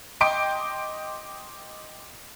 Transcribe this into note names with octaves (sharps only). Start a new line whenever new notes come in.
D#5 G5 C6 D6 G6 D7